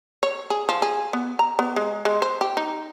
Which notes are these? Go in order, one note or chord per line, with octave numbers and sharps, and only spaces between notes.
C#5
G#4
F3
G#4
B3
A#5
B3
G#3
G#3
C5
G4
D#4